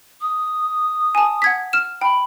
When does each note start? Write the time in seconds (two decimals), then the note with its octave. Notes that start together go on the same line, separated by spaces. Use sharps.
0.21 D#6
1.15 G#5 A5
1.42 F#5 G#6 B6
1.73 F6 E7
2.01 G5 B5